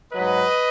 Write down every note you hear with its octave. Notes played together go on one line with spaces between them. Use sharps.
G#2 F#3 B4 D#5